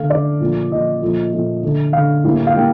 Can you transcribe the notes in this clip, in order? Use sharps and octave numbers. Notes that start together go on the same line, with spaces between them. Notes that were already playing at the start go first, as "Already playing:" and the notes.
Already playing: D3 A3 F5
D3 A3 D5
A#2 F3 A3
A#2 F3 A3 D#5
A#2 F3 A3
A#2 F3 A3
D3 A3
D3 A3 F5
A2 G3 A#3
F5
A2 G3 A#3 G5